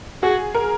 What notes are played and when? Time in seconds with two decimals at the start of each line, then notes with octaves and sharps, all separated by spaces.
0.23 F#4 G#4
0.55 A#4